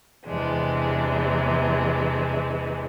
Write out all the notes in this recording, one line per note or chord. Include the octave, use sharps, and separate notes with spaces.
E2 C3 E3 G#3 D4